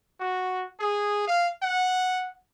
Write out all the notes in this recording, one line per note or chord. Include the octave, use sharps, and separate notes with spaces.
F#4
G#4
F5
F#5